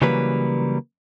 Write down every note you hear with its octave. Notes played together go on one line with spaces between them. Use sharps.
C#3 E3 F#3 G3 A#3 B4